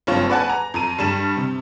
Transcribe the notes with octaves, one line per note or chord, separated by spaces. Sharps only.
F#1 G2 C4 F4 C#5
B4 D5 F#5 G#5 A5
A#5
F2 A#5 D#7
G2 G3 E7
C3